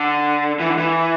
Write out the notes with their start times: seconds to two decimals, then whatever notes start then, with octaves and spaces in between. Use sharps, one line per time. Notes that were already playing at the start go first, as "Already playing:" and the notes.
Already playing: D3
0.60 E3
0.69 D3
0.77 E3